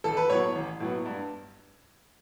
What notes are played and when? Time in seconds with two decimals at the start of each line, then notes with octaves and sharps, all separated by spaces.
0.04 A1 A4
0.17 B4
0.30 A2 F#3 B3 C#5
0.55 A1
0.80 A2 F#3 B3
1.06 G2